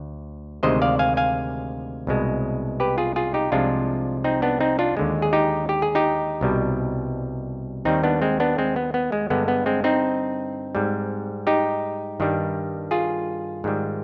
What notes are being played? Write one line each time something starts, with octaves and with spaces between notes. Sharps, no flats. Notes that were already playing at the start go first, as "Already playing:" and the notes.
Already playing: D2
D2 C3 D#3 G#3 C5 D#5
D5 F5
F5 G#5
F5 G#5
C2 B2 G#3
G4 B4
F4 G#4
F4 G#4
D#4 G4
C2 C3 F3 G#3 D4 F4
C4 D#4
B3 D4
C4 D#4
D4 F4
D#2 D3 G#3
G#4
D#4 G4
G4
G#4
D#4 G4
C2 B2 G3
D#2 D#3 G3 C4 D#4
B3 D4
G#3 C4
B3 D4
G#3 C4
B3
B3
G#3
G2 D3 G#3 B3
B3
G#3 C4
C4 D#4
G#2 G3
D#4 G4
G2 D#3 G3
F4 G#4
G#2 D#3 G3